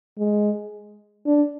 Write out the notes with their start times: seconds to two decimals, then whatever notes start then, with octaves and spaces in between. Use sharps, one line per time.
0.18 G#3
1.26 D4